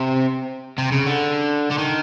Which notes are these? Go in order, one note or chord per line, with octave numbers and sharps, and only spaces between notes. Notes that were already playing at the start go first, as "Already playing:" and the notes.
Already playing: C3
C3
C#3
D3
D3
D#3